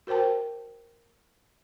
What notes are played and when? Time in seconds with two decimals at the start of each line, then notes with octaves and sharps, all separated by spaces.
0.07 F#4 A#4 C5 G5 A5